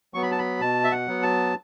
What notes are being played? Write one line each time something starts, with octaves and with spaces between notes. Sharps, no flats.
F#3 B3 C#6
B5
A5
B5
B2 A5
E5
F#5
F#3 B3
A5